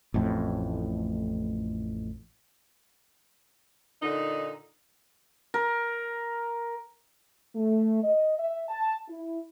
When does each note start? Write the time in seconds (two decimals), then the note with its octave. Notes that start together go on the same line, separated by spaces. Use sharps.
0.14 A1 F2 A2
4.02 A#2 D3 D#4
5.54 A#4
7.55 A3
8.03 D#5
8.38 E5
8.69 A5
9.08 E4